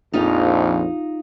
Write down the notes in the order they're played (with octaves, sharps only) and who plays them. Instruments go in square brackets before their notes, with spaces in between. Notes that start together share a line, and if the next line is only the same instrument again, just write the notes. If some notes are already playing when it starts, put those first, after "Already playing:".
[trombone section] A#1 F2 [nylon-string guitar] D#4 F4 G4